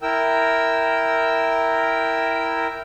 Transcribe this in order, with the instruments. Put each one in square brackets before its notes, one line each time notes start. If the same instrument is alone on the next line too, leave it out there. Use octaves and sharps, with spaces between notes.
[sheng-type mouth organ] E4 A#4 G5 E6